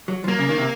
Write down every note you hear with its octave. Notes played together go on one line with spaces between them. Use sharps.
F#3
F3
F#3 A#3
C#3
D#3
C3